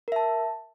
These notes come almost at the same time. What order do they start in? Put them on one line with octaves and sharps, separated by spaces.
A#4 E5 A5